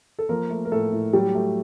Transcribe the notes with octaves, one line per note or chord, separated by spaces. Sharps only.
A4
F3 A#3 A#4
A3
A#4
A2 A3 A4
A2
F#3 G3 G4
A3